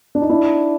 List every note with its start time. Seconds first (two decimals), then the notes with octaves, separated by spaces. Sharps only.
0.15 D4
0.22 D#4
0.29 D4 E4